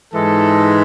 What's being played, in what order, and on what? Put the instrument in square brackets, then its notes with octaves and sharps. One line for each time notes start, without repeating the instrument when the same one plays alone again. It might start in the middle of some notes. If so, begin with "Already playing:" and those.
[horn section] G#2 E3 G#3 A4